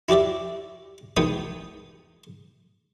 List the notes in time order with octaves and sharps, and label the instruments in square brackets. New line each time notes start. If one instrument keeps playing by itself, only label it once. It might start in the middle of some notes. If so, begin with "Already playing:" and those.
[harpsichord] E4 F#4 G4 D5 E5
B1 E2 B3 G5 D#6